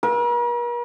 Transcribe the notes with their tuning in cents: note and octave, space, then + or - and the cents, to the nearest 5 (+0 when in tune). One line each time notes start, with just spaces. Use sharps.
A#4 +45 E6 +15